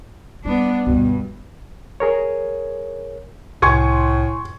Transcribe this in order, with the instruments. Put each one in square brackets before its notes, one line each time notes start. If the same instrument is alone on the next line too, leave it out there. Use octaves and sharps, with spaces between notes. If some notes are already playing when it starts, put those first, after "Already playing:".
[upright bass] G3 [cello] B3 D4
[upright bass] D2 [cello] G2 [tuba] B2
[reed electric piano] G#4 A#4 C#5
[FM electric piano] C2 [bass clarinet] A2 [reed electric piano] G#5 [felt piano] C6 C#6 G#6